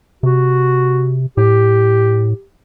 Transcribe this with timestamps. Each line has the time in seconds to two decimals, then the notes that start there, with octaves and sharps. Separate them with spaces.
0.23 C3 F#4
1.37 A2 G4